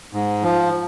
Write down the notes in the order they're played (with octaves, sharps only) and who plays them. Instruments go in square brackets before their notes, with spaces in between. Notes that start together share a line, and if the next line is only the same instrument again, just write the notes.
[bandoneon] G#2
F3